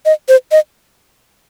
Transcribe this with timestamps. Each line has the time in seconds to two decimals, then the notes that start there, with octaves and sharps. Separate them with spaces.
0.06 D#5
0.29 C5
0.52 D#5